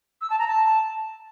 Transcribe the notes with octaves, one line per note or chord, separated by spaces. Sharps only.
E6
A5
A#5
A5